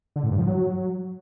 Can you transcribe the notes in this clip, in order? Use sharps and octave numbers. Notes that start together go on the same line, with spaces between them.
D3
A2
G2
F3
F#3